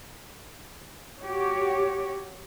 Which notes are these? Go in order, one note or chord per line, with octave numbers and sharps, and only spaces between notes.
F#4 G4 C#5